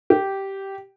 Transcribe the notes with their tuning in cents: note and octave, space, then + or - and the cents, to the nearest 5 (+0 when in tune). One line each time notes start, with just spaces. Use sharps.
G4 -10